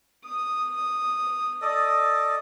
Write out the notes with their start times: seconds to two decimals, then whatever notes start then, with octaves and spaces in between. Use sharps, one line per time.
0.25 D#6
1.62 A4 D5 D#5